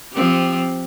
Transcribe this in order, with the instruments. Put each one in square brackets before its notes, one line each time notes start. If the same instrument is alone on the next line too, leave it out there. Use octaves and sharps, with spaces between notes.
[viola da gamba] F3 C4 G4